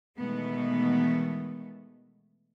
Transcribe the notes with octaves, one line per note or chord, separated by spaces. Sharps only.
B2 D#3 E3 G#3 A3 B3